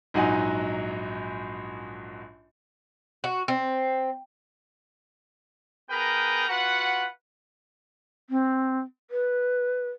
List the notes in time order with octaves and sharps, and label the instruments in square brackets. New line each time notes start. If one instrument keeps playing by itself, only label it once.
[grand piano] A#1 G#2 F#3 D#4 F#5 G#5
[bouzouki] F#4
C4
[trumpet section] B3 G#4 A#4 B4 G5 A#5
F4 F#4 B4 F#5
[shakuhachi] C4
B4